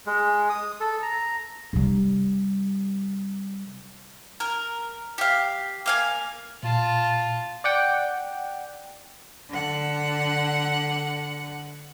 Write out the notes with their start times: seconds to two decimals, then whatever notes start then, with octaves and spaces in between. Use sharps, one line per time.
0.06 G#3
0.49 D#6
0.80 A4
1.02 A#5
1.73 C3 G3
4.40 A#4
5.18 G4 F5
5.86 A#3 F5 G#5
6.63 A#2 F4 A5
7.64 D5 F#5 G5
9.50 D3 F#5